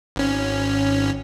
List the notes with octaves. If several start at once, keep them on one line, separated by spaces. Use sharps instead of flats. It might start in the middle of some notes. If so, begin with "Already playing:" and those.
G#1 C#4